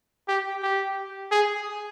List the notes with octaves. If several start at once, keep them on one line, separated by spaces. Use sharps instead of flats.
G4
G4
G#4